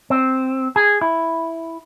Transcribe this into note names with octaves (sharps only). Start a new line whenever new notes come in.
C4
G#4
E4